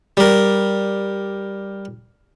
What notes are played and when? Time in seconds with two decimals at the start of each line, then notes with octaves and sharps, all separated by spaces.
0.17 G3 A#4